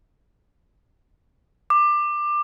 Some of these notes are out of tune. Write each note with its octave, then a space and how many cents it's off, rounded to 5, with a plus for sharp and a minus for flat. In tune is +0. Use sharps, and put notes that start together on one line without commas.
D6 +20